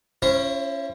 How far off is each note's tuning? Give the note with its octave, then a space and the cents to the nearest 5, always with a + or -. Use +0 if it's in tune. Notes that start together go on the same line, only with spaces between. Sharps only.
C#4 -5 E4 +40 C5 +35